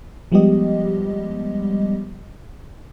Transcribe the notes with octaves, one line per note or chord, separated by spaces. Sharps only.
F3 G3 G#3 B3 G4 D#5